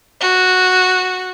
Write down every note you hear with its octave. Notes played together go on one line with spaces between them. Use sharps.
F#4